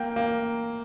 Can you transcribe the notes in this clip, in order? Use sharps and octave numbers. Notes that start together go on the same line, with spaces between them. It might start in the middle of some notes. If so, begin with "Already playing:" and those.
Already playing: A#3 G5
A#3